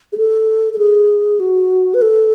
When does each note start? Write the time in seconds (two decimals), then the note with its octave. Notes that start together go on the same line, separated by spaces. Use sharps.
0.12 G#4
0.17 A4
0.73 A4
0.78 G#4
1.40 F#4
1.94 B4
2.02 A4